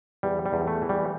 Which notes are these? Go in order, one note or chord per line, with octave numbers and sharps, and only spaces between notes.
E2 G3
G3
E2
A3
E3
G3